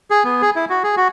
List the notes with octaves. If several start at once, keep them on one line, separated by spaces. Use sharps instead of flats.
G#4
B3
G#4
E4
F#4
G#4
F#4